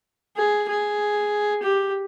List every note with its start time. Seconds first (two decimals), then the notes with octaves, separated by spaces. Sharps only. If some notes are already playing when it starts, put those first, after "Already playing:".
0.36 G#4
0.68 G#4
1.62 G4